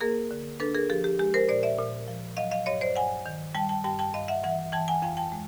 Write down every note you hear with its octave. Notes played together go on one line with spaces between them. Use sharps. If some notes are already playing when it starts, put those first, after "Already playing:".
A#3 G#4 A#4
D3
D4 A4 B4
G#4 A#4
F3 G4 A4
G4
G#3 G4
A#4 C5
A#2 C5 D5
D5 E5
A#2
F3
F#3 D#5 F5
D#5 F5
G2 C#5 D#5
C5 D5
G2 F#5 G#5
D#3
G3 G5 A5
G5 A5
G2 G5 A5
G5 A5
G2 D#5 F5
E5 F#5
E3 E5 F#5
E3 G5 A5
F#5 G#5
F2 F5 G5
G5 A5
G#3